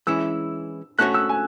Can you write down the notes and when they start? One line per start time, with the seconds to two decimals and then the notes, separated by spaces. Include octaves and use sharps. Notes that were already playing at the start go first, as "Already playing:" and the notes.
0.07 E3 G#3 C#4 E4 E6
0.99 A3 C#4 F#4 C#5 F#6
1.14 E6
1.29 G#5